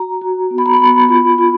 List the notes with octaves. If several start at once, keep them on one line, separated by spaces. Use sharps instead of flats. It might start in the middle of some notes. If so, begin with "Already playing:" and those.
Already playing: F#4 A#5
F#4
B3
B5
A#5
B5
B3
F4
F4